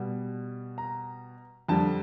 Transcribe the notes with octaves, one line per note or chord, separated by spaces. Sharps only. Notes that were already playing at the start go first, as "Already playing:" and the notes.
Already playing: B2 G3
A#5
F2 D3 G3 A5